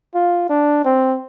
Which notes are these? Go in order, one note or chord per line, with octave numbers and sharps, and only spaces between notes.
F4
D4
C4